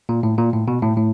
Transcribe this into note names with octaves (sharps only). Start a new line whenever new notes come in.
A#2
A2
A#2
A2
B2
A2
A2